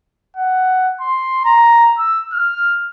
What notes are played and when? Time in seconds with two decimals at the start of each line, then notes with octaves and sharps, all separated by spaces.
0.36 F#5
1.01 C6
1.45 A#5
1.98 E6
2.32 F6